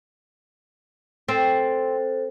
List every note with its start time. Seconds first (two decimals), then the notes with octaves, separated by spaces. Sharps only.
1.28 C4 A4 C5